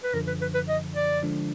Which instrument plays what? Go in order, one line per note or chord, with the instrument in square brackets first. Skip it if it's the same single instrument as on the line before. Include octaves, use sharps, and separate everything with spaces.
[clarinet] B4
[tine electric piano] F#2 D3 F3 [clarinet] A#4
[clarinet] B4
B4
B4
D#5
D5
[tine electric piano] D3 F3 G#3 D4